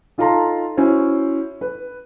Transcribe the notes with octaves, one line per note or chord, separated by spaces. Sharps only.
D#4 F4 A4 A5 A#5 C6
C#4 E4 F#4 C5
B4